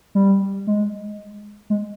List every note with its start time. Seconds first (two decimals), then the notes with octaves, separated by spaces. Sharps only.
0.15 G3
0.67 G#3
1.70 G#3